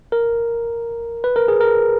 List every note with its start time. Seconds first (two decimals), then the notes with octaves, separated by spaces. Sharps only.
0.12 A#4
1.24 B4
1.36 A#4
1.48 G#4
1.61 A#4